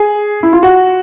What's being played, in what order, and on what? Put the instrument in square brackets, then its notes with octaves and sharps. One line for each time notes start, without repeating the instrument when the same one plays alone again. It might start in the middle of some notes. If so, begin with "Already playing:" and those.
Already playing: [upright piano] G#4
E4
F4
F#4